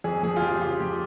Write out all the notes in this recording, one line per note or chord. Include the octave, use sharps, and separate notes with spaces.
F2 G#4
F3 G#4
F4
F2 G4
C#3 F4
F3 G4